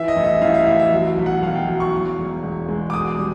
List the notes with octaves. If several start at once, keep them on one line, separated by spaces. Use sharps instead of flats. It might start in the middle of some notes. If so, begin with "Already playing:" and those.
Already playing: E3 E5
D#5
A1
E5
A1 F5
E5
A1 F5
E5
F#3
B1
F#5
B1 F5
G5
F#3
C#6
E2
E1
E1
G#3
D6
B2 D#6
G3